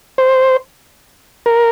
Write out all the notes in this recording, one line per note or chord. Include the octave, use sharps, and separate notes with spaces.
C5
A#4